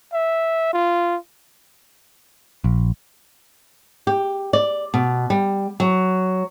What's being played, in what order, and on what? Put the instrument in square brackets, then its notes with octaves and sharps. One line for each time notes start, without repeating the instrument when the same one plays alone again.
[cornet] E5
F4
[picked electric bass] A#1
[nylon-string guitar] G4
D5
B2
G3
F#3